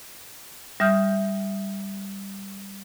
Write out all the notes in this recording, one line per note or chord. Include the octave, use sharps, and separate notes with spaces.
G3 E5 D#6 F6 G6